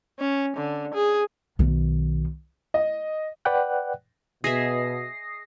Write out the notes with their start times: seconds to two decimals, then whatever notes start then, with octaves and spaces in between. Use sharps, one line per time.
0.19 C#4
0.56 D3
0.94 G#4
1.59 B1 D#3
2.74 D#5
3.45 B4 D5 F#5 G5 F#6
4.44 B2 G#4 D#5 E5 D#6 A#6 C7